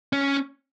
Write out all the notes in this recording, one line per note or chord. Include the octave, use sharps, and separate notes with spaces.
C#4